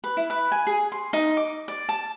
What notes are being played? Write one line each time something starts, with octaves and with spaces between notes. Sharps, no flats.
B4
E4
B4
G#5
G#4
C6
D#4
D6
D5
A5